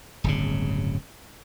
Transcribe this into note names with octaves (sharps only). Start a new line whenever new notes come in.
D1 G1 C#3